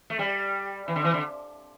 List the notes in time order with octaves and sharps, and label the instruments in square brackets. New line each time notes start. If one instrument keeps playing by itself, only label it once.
[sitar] A3
G3
E3
D3
E3
D3